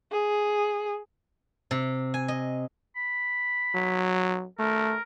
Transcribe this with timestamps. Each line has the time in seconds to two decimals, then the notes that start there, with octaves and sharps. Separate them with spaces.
0.12 G#4
1.71 C3
2.14 G#5
2.28 D#5
2.96 B5
3.74 F#3
4.59 A3 A#4